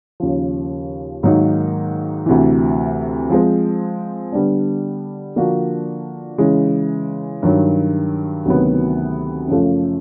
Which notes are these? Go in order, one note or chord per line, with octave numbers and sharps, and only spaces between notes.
D#2 C#3 F3
G#2 D#3 F#3 A#3 D#4
D2 C3 E3
F3 G#3 C4
D3 G3 B3 D4
D3 F3 A#3 D4 F#4
C#3 E3 G#3
G2 D#3 F#3
D2 C3 D#3 F#3 B3
F#2 C#3 F3 A3